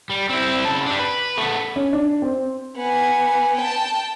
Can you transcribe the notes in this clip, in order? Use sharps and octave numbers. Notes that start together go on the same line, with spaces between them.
G3
C4 E4
C#3 A5
G3 D4
B4
A3 B3
C#4
D4
C4
B3 G#5
G5 A5